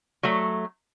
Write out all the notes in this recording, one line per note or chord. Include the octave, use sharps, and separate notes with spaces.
F#3 A3